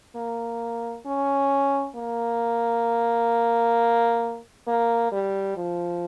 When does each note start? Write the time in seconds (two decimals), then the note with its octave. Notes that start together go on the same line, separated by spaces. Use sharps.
0.16 A#3
1.06 C#4
1.95 A#3
4.67 A#3
5.12 G3
5.57 F3